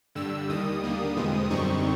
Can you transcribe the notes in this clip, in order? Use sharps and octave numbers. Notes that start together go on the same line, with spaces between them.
G2 D3 G3 E6
D#2 D#3 G3 D#6
D3 G3 A#3
E2 B2 G#3 C4
F#2 D3 G3 C4 D#4 C#6